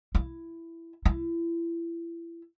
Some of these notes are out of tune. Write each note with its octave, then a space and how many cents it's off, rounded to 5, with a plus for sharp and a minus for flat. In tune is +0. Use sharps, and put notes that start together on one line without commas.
E4 +10
E4 +30